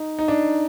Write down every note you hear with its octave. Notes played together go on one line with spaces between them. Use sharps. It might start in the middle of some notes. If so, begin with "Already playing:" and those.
Already playing: D#4
D#4
D4